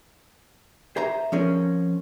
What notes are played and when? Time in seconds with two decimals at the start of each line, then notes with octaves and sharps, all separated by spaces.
0.96 G#4 C5 E5 A#5
1.32 F3 C4 C#4 G#4 A#4